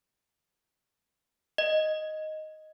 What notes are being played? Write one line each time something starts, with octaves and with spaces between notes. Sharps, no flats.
D#5